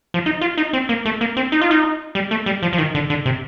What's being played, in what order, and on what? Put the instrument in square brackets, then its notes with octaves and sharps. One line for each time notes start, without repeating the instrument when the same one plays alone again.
[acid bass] F3
D#4
F4
D#4
C4
A#3
A3
A#3
C4
D#4
F4
D#4
G3
A3
G3
F3
F3
D#3
D3
D3
C3